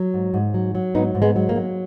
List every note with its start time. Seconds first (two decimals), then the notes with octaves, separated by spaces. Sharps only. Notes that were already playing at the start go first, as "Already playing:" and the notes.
Already playing: F#3
0.14 G#2
0.34 G#2
0.54 F#3
0.75 F#3
0.95 G#2 B3 D#4
1.15 G#2
1.22 G#3 B3
1.36 F#3
1.49 A#3
1.56 F#3